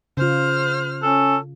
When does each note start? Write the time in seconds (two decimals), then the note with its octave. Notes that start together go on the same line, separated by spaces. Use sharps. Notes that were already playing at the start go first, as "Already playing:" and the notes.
0.17 C#3 F4 C5 F6
1.03 C#4 A4